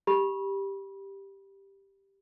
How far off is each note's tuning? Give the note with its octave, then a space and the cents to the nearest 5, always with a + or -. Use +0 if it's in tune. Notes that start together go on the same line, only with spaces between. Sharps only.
G4 +0 B5 -30